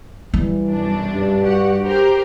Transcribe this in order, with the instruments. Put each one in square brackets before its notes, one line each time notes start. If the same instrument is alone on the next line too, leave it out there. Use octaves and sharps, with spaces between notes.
[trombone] E3 [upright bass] G3
[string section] B1 F#2 D4
[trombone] G2
[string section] F#4 G4 F#5
G4 A#4 C5